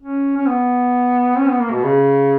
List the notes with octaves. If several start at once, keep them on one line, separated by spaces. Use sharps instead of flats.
C#4
C#4
B3
C#4
B3
A#3
B2
C#3